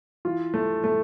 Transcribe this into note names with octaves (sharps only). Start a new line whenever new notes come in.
E3 F4
A3
A3